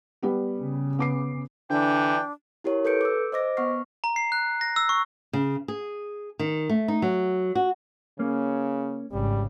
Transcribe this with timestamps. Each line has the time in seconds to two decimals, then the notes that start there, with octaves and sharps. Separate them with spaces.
0.23 G3 B3 G4
0.60 C#3
0.99 B3 D6 C7
1.70 D3 E3 D4 G5
2.64 E4 G4 A#4 C#5
2.85 A4 B4 G6 C#7 D7
3.01 D6 E6
3.32 C5 D#5 D6 A#6
3.57 B3 F#5 C#6 F6 C7
4.04 A#5
4.16 C7
4.32 F#6
4.61 A#6
4.76 E6
4.89 C#6
5.33 C#3
5.68 G#4
6.39 D#3
6.70 A3
6.88 D#4
7.02 F#3
7.55 F#4
8.19 C#3 A#3 C#4
9.12 G#1 C#3 G3